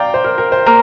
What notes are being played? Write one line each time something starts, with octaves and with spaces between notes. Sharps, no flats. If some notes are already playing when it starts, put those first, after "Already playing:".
Already playing: D5 F5 G5 A#5
C5
A#4
A#4
C5
A#3